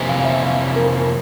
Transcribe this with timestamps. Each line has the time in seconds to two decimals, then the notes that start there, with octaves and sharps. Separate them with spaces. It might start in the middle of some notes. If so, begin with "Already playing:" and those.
Already playing: F2 C3 E3 A#3 E4
0.09 F5
0.25 E5
0.42 F5
0.76 A#4